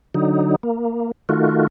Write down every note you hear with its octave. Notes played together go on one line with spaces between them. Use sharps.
D3 F#3 D#4
A#3
D#3 A3 F4 F#4